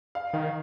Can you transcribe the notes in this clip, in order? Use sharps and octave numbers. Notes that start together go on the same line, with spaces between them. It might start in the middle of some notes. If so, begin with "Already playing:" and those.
F5
D#3 F5